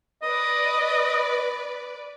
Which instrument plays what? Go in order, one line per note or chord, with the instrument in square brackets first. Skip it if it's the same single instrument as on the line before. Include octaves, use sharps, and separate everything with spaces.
[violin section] B4 D5 [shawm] D#5